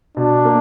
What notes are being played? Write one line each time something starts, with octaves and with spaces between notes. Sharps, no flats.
B2 D4
A#3